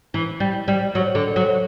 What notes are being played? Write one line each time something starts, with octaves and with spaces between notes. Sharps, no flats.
E3
G3
G3
F#3
D3
F#3